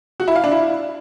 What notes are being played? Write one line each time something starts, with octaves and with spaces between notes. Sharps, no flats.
F#4
E4
F5
D4
E4